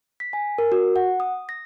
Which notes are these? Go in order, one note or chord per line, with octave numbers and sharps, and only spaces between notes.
B6
G#5
A#4
F#4
F#5
D#6
A#6